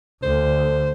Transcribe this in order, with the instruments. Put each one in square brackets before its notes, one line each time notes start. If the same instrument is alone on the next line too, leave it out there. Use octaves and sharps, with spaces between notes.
[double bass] D2 [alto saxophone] C5